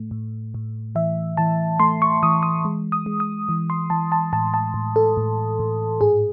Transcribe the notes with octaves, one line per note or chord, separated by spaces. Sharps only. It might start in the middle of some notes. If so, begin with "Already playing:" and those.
Already playing: A2 A3
A2
A2
E3 E5
E3 A5
A3 C6
C#6
E3 D#6
D#6
G#3
D#6
G#3
D#6
E3
C6
E3 A5
A5
A2 A5
A5
A2
A4
A2
A2
G#2 G#4